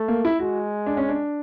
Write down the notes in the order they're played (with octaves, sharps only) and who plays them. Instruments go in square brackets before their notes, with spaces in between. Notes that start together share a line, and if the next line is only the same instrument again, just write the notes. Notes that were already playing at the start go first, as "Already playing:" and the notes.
Already playing: [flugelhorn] A3
[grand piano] A#3
E4
[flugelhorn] G#3 [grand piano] F#4
[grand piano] D4
C#4
D4